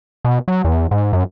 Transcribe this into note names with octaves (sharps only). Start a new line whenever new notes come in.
B2
F#3
E2
G#2
F#2